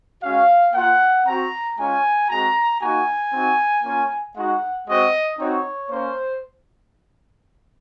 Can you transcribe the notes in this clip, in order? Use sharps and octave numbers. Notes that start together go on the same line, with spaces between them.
G#3 C#4 F#4 F5
A#3 F4 F#5
C4 F#4 A#5
G#3 C#4 F4 G#5
G#3 C4 F#4 A#5
A#3 D#4 F#4 G#5
C4 D#4 F#4
A#3 C#4 F4
G#3 D#4 F#4 F#5
G#3 C4 F#4 D#5
C4 D#4 F#4 C#5
A#3 C#4 C5